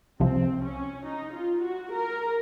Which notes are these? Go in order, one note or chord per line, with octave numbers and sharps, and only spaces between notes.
C2 C3 F3 C4
C#4
D#4
F4
F#4
A#4